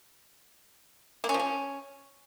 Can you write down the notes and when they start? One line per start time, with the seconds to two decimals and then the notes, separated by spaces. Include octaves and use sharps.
1.24 A#3
1.29 C#4
1.34 F3
1.39 C#4